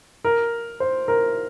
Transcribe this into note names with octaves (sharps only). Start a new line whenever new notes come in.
A#4
C5
A#4